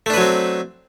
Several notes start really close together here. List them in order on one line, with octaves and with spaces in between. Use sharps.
A3 D4 B4 F#3 C4